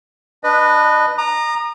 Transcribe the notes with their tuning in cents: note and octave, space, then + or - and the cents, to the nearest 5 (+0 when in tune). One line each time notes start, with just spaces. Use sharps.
D4 +0 B4 +0 D#5 -25
A#5 +0 D#6 -40